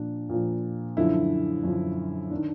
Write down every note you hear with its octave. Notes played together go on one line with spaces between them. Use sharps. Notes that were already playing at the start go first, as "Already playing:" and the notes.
Already playing: A#2 F3 D4
A#2 F3
F#2 D3 F3 E4
F#2 D3 F3
D#3 D4